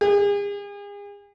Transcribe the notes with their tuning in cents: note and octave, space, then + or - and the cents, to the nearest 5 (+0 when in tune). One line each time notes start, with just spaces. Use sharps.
G#4 -40